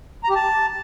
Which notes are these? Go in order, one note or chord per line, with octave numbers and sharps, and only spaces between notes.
A#5
G4
A5